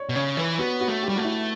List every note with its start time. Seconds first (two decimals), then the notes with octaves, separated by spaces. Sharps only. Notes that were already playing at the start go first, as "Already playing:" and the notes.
Already playing: C#5 D5
0.09 B2
0.15 C#3 C#5
0.37 E3 B4
0.59 B3 F#4
0.81 F#4
0.88 A3
1.03 G4
1.09 G3
1.16 A3 F#4
1.25 E4